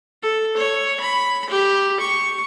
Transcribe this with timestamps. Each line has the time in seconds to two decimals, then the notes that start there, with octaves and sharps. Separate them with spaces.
0.23 A4
0.57 C#5
1.00 B5
1.50 G4
2.00 C#6